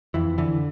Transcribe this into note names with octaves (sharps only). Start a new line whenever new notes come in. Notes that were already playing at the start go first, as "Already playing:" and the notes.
F2 E3
D3 E3